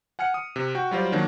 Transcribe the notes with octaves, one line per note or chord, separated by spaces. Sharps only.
F#5 G#5 F6 C#7
D#6
C3
F#4 G5
F#3 G3 F4 C5 D5
D#3 F#3 A#3 D4